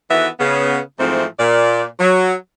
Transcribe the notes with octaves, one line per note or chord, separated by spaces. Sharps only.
D#3 E3 B3 F#4 A4 E5
C#3 B3
G#2 E3 F3 A3 C4
A#2 D5
F#3